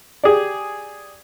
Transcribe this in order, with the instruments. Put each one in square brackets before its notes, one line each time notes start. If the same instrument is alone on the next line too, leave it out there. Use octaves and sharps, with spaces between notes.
[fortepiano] G4 G#4 D5